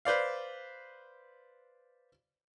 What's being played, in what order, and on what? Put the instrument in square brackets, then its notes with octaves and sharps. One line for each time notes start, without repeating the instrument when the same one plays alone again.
[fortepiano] B4 C5 D5 F5